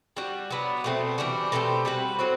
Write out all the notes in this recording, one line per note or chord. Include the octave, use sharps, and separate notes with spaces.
G3 D4 F#4
F#3 B3 D4
B2 A3 C4
E3 G3 D4 F#4
B2 A3 C4 G4
G3 C4 F#4 B4
A2 F#3 C4 F#4